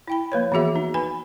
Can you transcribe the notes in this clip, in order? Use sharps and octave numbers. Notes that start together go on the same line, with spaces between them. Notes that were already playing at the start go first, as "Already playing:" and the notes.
E4 G5 B5
F3 A#3 B4 C#5
E3 B3 F#4 G#4 E5
D#4
B4 G#5 B5